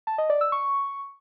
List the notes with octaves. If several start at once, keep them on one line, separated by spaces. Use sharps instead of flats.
A5
D#5
D5
E6
C#6